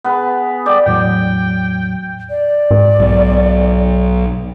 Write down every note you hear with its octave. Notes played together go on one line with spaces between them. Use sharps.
B3 G#4 B4
G3 D5 G5
E2 A2 F#3 G5
D5
G#2
B1